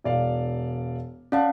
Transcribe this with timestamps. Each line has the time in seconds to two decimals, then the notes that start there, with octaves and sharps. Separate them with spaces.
0.04 E1 D5 F5
1.32 C#4 D5 F5 F#5 A5